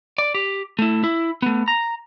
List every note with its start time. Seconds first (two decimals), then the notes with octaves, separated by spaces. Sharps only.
0.18 D5
0.35 G4
0.79 A3 E4
1.04 E4
1.42 A3 B3
1.68 A#5